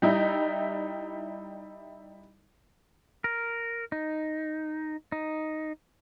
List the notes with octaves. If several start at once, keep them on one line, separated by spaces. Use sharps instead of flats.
G3 D#4 E4
A#4
D#4
D#4